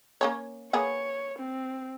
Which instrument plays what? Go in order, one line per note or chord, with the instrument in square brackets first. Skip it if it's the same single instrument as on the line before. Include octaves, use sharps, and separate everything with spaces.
[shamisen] A#3 C#4 C#5
[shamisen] A#3 B3 G#4 [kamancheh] C#5
[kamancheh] C4